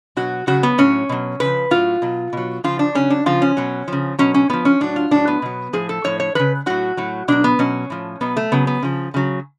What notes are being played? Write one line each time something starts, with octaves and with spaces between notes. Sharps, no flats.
B2 F#3 F#4
C#3 F#3 F#4
B3
A2 F#3 C#4
B2 F#3
C#3 F3 B4
A2 F#3 F4
B2 F#3
B2 F#3
C#3 F3 F4
D4
C#3 F#3 C#4
D4
C#3 F3 F4
C#4
B2 F#3
C#3 F3
B2 F#3 C#4
C#4
A2 F3 B3
C#4
A2 F#3 D4
F4
A2 F#3 D4
B3
B2 F#3
A2 F3 G#4
A4
A2 F3 C#5
C#5
C#3 F3 B4
A2 F#3 F#4
A2 F#3
B2 F#3 D4
B3
B2 F#3 C#4
A2 F3
B2 F#3 B3
A3
C#3 F#3 B3
B3
C#3 F3
C#3 F#3